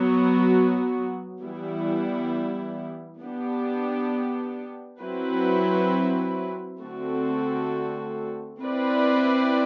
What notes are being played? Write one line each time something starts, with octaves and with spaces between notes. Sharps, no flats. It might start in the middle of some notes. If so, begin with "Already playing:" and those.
Already playing: F#3 B3 F#4
E3 G3 B3 E4
B3 D4 G4
F#3 C4 E4 B4
D3 A3 C4 F#4 A4
C4 E4 B4 D5